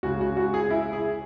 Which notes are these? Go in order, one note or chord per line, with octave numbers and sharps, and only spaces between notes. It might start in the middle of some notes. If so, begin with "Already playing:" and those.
C#2 C#3 G#3 F#4
F#4
F#4
G#4
E4
G#4